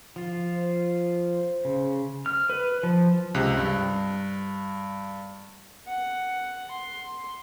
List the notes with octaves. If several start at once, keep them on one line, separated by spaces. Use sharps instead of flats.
F3 F4
C5
C#3
F6
B4
F3
C#2 C3 F#6
G2
F#5
C6